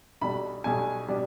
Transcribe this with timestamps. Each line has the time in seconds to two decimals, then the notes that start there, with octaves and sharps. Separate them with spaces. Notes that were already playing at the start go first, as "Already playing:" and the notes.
0.21 B1 B2 G3 D4 B5
0.64 B1 B2 G3 D4 G#5
1.08 B2 G3 D4